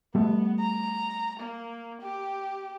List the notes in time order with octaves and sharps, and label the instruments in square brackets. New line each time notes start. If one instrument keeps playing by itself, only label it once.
[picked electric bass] G3 A3 [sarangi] B3
[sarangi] A#5
A#3
G4